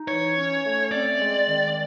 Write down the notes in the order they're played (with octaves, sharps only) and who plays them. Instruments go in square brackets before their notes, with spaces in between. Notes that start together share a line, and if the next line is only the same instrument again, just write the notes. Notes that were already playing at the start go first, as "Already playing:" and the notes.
Already playing: [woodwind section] D#4
[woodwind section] E3 [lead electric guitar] C#5
[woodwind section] C#4
A3
[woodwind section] C4 [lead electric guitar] D5
[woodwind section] G#3
D#3